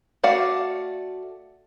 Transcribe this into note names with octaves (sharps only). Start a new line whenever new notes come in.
A3 F#4 D5 F5